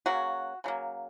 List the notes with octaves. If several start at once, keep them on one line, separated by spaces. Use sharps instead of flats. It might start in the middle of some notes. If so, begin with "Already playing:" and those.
C#3 F#3 A#3 F#4
C#3 F#3 A#3